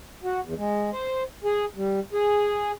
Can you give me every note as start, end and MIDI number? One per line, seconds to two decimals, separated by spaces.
0.24 0.40 66
0.43 0.54 40
0.57 0.90 56
0.92 1.23 72
1.44 1.65 68
1.76 2.00 55
2.13 2.72 68